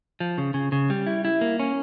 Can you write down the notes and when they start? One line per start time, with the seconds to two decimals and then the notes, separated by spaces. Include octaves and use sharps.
0.20 F3
0.38 C#3
0.54 C#3
0.72 C#3
0.90 G3
1.07 E4
1.25 E4
1.41 A#3
1.60 C#4